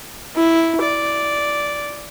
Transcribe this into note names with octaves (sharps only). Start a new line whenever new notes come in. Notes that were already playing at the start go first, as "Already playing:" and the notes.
E4
D5